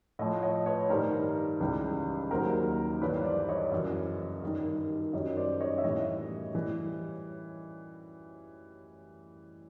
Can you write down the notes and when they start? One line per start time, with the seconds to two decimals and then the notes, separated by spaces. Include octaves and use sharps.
0.19 A2 F3 C#5 D#5
0.42 C#5 D#5
0.66 B4 C#5
0.89 G2 D#3 G3 A#4 C5
1.60 C#2 C#3 E3 G3
2.31 D#2 D#3 F#3 A#4 C5
3.01 G2 E3 G3 B4 C#5
3.24 C5 D5
3.48 C#5 D#5
3.72 F#2 C#3 E3
4.43 G2 D#3 G3
5.13 F#2 D#3 G3 C#5 D#5
5.36 C5 D5
5.60 C#5 D#5
5.78 E5
5.84 A2 E3 G3 C#5 D#5
6.55 E3 G3